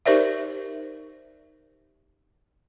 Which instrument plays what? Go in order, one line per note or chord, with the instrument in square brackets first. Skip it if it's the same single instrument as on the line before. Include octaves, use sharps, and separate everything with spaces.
[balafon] D#4 G4 A#4 C5 D5 E5